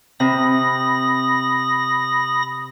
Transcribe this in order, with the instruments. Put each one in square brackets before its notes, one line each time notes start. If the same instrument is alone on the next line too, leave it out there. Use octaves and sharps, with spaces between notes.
[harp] C3 [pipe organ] B5 D#6 A#6